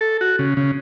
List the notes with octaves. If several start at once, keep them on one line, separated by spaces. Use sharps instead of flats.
A4
F#4
C#3
C#3